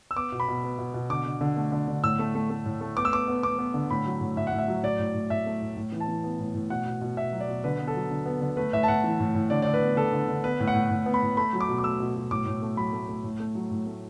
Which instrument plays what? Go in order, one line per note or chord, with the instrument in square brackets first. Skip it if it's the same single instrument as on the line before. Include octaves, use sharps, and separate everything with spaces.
[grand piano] E6
B3 D6
B2
B5
B2
B3
B2
B2
D3 D6
D3
D3
A3
D3
D3
A2 E6
A3
A3
A3
A2
A3
B3 D6
E6
B3 D6
B3
B3 D6
B3
D3
A2 B5
F#3
A2
A2 E5
F#5
A2
E5
F#3
A2 D5
A2
A2
A2 E5
A3
A2
A2
E3
A5
E3
B3
A2
A2
B2 F#5
B2
B2
B2 E5
F#3
D5
B2
D3 B4
B3
A4
F#3
D3
B3
D3
A3 B4
A2 E5
A5
A2 F#5
E3
A2
A2
D3 D5
D3 D5
B4
B3
D3 A4
D3
D3
B3 B4
A2
F#5
A2
A2
B3
B5
A2
A3 B5
F#3
D6
B2
D6
A3 E6
B2
B2
A2 D6
A2
A3
F#3 B5
A3
A3
A2
A3
F#3
A2
A3